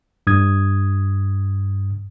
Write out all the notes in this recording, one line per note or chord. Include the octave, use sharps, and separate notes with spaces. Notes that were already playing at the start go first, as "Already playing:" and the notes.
G2 D#6 G#6